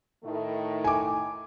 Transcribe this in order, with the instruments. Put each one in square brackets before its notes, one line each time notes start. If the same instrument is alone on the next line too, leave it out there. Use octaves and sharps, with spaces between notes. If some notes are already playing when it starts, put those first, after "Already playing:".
[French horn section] A2 D#3 A3
[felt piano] G#5 D6